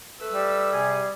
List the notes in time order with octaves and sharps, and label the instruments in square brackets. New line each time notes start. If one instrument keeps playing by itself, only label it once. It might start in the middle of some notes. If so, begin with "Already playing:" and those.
[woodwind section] A3 B4 E6
[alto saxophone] G3
[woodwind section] C3 G#4